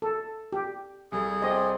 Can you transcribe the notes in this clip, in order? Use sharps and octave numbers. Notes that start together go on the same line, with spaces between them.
A4
G4
C2 G3 G#4 A4
C4 D5 D#5 G5